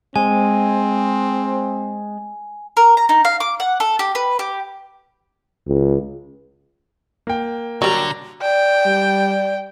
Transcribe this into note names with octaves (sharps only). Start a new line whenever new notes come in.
G#3 C4 G#5
A#4
A#5
D#4
F5
D6
F#5
A4
G4
B4
G4
C#2
A#3 G5
D3 F#3 G3 A#5
D5 G5
G3